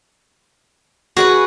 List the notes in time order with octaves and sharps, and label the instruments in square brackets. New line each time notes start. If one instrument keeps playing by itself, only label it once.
[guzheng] F#4 [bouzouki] G#4 A#4 B4